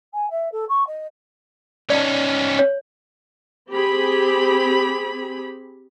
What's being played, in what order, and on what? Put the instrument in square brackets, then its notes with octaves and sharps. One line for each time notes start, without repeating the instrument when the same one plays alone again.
[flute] G#5
E5
A4
C#6
D#5
[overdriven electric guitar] C#4 D#4 [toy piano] D5 A5
[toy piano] C#5
[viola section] C4 G4 G#4 B5